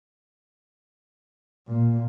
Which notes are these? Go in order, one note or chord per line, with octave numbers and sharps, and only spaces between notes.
A#2